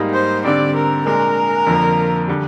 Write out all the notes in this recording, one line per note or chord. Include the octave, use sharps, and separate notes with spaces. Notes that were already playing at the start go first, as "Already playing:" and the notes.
Already playing: G#2 G3 A#3 D#4
C5
D3 G3 C4 D5
A#4
A#2 G#3 D4 A#4
F2 D3 F3 A#3
D3 G3